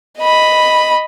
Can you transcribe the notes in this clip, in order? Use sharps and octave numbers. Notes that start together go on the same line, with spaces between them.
D#5 B5